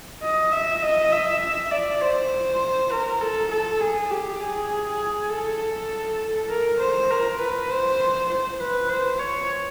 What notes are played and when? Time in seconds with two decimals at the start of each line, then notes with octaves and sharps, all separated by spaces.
0.22 D#5
0.52 E5
0.82 D#5
1.12 E5
1.71 D5
2.01 C5
2.91 A#4
3.21 A4
3.51 A4
3.81 G#4
4.11 G4
4.40 G#4
5.30 A4
6.49 A#4
6.79 C5
7.10 A#4
7.39 B4
7.70 C5
8.29 C5
8.59 B4
8.89 C5
9.19 C#5